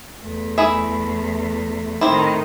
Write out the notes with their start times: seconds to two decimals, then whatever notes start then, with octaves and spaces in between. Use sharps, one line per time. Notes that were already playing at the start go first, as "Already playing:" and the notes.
0.22 E2 A3
0.58 E4 G#4 E5
2.01 A2 D#3 C4 E4